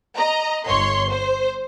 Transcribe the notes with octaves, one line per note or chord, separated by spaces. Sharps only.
D#5 A#5
G1 C#5 C6
C5